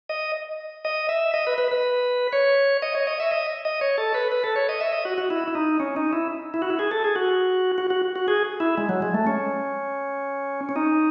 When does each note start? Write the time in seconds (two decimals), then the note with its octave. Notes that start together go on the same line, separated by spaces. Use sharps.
0.09 D#5
0.85 D#5
1.09 E5
1.34 D#5
1.47 B4
1.58 B4
1.71 B4
2.33 C#5
2.82 D#5
2.95 C#5
3.07 D#5
3.20 E5
3.32 D#5
3.65 D#5
3.81 C#5
3.98 A4
4.14 B4
4.32 B4
4.44 A4
4.56 C#5
4.69 D#5
4.81 E5
4.93 D#5
5.05 F#4
5.18 F#4
5.30 E4
5.48 E4
5.55 D#4
5.80 C#4
5.96 D#4
6.13 E4
6.54 E4
6.62 F#4
6.70 E4
6.79 G#4
6.91 A4
7.04 G#4
7.16 F#4
7.78 F#4
7.90 F#4
8.16 F#4
8.28 G#4
8.60 E4
8.78 G#3
8.89 F#3
9.02 G#3
9.14 A3
9.27 C#4
10.69 C#4
10.76 D#4